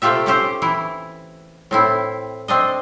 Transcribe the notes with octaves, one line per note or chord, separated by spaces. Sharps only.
C3 A3 F4 G4 E5
C4 C#4 G4 C5
E3 E4
A2 C4 E4
C4 D4 D#5